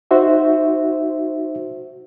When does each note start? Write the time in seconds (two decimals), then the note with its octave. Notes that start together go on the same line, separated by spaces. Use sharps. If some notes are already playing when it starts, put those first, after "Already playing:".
0.11 D#4 F#4 C5 E5